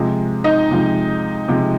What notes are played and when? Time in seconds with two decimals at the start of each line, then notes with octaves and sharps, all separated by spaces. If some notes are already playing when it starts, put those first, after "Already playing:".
Already playing: C3 F3 G#3
0.44 D#4 D#5
0.71 C3 F3 G#3
1.48 C3 F3 G#3